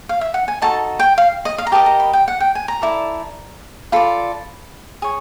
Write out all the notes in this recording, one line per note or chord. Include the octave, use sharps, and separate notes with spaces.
F5
E5
F#5
G#5
D#4 F#4 A4 A5
G5
F5
D#5
F5
A#5
G4 A#4 D#5 A5
A#5
B5
G5
F#5
G5
G#5
A#5
E4 A4 D5
F4 A4 D5 B5
G#4 C#5